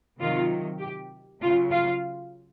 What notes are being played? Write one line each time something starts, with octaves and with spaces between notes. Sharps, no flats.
C3 D#3 F#3 F4
G4
C#3 F#3 F4
F4